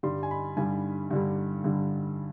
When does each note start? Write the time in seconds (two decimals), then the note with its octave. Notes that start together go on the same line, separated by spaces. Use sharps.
0.03 G2 D3 G3 C6
0.23 G#5
0.31 B5
0.57 G2 D3 G3 G#5
1.11 G2 D3 G3
1.64 G2 D3 G3